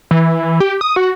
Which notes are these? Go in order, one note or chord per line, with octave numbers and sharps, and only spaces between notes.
E3
G4
D#6
F#4